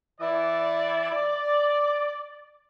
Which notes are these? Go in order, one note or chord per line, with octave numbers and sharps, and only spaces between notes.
E3 E4 D5
D5